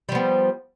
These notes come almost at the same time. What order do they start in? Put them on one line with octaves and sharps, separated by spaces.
G3 F3 B3